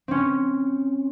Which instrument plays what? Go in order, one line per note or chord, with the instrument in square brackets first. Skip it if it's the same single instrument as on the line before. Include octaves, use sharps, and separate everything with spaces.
[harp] C4 C#4